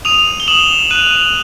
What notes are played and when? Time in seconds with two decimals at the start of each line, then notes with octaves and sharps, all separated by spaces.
0.05 D#6 D#7 F7
0.40 G7
0.48 D#6 E7 F#7
0.90 F#6 D#7 F7
1.11 D#7 F7